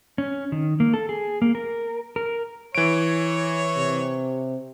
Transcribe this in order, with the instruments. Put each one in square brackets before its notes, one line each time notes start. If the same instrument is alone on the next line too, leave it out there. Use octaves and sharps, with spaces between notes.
[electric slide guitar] C#4
D#3
A#3
A4
G#4
A#3
A#4
A#4
[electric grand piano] E3 D7 [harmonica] C#5
[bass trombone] C3